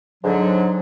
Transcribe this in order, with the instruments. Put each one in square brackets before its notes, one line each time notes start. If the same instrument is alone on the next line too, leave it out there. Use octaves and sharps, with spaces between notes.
[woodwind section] G#2 D3 F#3